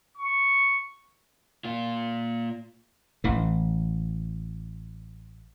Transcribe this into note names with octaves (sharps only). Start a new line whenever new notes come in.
C#6
A#2 F4
A1 E3